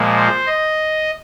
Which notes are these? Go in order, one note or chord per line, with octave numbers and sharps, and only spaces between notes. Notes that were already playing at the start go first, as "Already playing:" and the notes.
Already playing: A#2 F3 G#3
C5
D#5